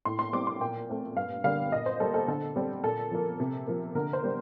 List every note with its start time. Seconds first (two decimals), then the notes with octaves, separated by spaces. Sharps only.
0.05 A2 C6
0.19 C6
0.33 G3 C4 D6
0.47 C6
0.60 A#2 G5
0.89 A3 C4
1.16 G2 F5
1.44 D3 G3 A#3 F5
1.72 A#2 D#5
1.86 C5
2.00 G3 A#3 A4
2.14 A4
2.28 D3 A4
2.56 G3 C4
2.84 A#2 A4
3.11 F3 A#3
3.40 C3
3.67 F3 A#3
3.95 D3 A#4
4.13 C5
4.23 G3 A#3